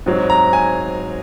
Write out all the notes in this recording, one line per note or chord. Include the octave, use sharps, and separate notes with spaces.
G#2 F#3 C4
A#5
G#5